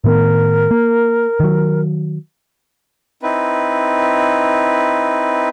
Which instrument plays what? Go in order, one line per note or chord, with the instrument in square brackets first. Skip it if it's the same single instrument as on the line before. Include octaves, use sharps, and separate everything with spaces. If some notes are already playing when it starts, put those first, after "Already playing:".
[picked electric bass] A2 D#3 B3 [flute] A#4
[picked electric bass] A#3
D#3 F#3
[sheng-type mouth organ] C4 D#4 E4 B4